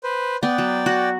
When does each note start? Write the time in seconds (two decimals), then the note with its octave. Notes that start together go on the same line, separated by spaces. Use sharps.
0.04 B4 C5
0.43 B3 D5 G5
0.58 F#3
0.86 F#4